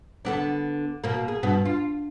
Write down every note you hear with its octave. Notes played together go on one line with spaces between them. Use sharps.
D3 B3 D4
B2 A#3
G#4
G2 B2 B3
F4